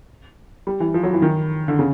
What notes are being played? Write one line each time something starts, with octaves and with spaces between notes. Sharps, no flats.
G3
E3
F3
F#3
E3
D#3
D3
C#3